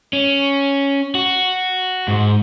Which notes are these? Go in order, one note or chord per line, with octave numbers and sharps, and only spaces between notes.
C#4
F#4
G#2